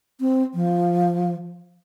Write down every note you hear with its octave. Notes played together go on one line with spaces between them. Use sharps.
C4
F3